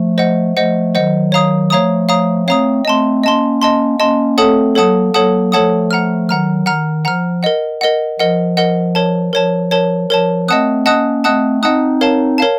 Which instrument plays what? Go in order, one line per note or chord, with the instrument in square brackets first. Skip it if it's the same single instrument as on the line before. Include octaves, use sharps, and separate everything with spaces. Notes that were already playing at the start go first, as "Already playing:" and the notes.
Already playing: [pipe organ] F3 A3
[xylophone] C5 D#5 F#5
[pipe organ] F3 A3 [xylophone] C5 D#5 F#5
[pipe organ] D#3 F#3 [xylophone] C5 D#5 F#5
[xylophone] C#5 F5 A#5 D#6
[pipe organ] F3 A3 [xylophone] C#5 F5 A#5 D#6
[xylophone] C#5 F5 A#5 D#6
[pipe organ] A3 C4 [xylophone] C#5 F5 A#5 D#6
[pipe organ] A3 C4 [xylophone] D#5 A5 C6
[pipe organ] A#3 C#4 [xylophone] D#5 A5 C6
[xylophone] D#5 A5 C6
[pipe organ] A#3 C#4 [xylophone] D#5 A5 C6
[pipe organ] A3 C4 [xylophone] A4 C#5 F#5 A5 D#6
[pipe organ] F#3 A#3 [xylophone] A4 C#5 F#5 A5 D#6
[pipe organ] F#3 A#3 [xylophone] A4 C#5 F#5 A5 D#6
[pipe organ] F3 A3 [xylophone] A4 C#5 F#5 A5 D#6
[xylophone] F#5 A#5 F6
[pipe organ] D#3 F#3 [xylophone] F#5 A#5 F6
[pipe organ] D#3 [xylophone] F#5 A#5 F6
[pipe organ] F3 [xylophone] F#5 A#5 F6
[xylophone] A#4 D#5 F#5
A#4 D#5 F#5
[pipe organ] F3 [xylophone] A#4 D#5 F#5
[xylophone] A#4 D#5 F#5
A#4 C#5 A5
[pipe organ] F3 [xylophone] A#4 C#5 A5
[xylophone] A#4 C#5 A5
[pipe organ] F3 [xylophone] A#4 C#5 A5
[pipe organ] A3 C4 [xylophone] D#5 F#5 A5 D#6 F#6
[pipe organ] A#3 C#4 [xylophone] D#5 F#5 A5 D#6 F#6
[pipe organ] A3 C4 [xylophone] D#5 F#5 A5 D#6 F#6
[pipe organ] C4 D#4 [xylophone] D#5 F#5 A5 D#6 F#6
[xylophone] A#4 C#5 F5 A5
A#4 C#5 F5 A5